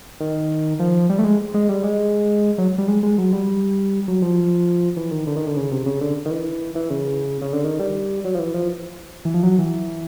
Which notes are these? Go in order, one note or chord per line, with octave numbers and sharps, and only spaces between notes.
D#3
F3
G3
A3
G#3
G#3
G3
G#3
F#3
G3
G#3
G#3
F#3
G3
F#3
F3
E3
D#3
D3
D#3
D3
C#3
C3
C#3
D3
D#3
E3
E3
C#3
C#3
D3
D#3
G3
F#3
F3
E3
F3
E3
F3
F#3
E3